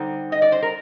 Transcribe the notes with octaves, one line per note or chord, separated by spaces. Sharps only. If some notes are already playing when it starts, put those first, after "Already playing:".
Already playing: D3 G3 C4 D#4 C5
D#5
D5
C5
A#4